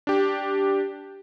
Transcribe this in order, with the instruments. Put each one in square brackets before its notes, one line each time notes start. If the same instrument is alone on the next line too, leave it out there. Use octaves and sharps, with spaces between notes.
[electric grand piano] D4 G4